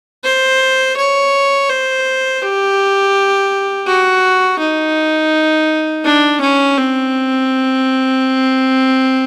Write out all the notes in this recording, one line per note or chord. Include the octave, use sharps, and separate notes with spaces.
C5
C#5
C5
G4
F#4
D#4
D4
C#4
C4